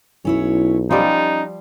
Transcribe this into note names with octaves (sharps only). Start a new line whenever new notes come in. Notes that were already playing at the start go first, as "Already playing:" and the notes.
B1 C#4 E4 C#5
F3 G3 C#4 D#4 D5